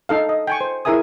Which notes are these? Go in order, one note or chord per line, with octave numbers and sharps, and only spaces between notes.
D#4 A4 F5
D#5
G5 G#5 C#6
C5
E4 G#4 A#4 E5 G#5 D#6